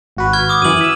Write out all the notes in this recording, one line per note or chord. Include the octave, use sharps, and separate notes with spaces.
G#1 F#4 B4
C#6 F6 G#6
D6 D#6
F#2 E3 D#7 F#7
E5 E6